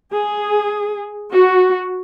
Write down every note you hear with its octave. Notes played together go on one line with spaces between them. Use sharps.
G#4
F#4